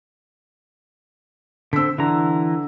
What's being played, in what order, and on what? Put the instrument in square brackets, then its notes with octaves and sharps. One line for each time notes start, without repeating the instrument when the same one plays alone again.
[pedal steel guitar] D3 C4 [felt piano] E6 B6
[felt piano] D3 [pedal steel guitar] E3 A#5